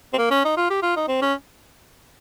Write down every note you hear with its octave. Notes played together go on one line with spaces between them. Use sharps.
C4
A#3
C#4
D#4
F4
G4
F4
D#4
C4
C#4